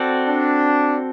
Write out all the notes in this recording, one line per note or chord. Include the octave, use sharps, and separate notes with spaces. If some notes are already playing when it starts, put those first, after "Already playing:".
Already playing: C4 F#4 A4 D5
D4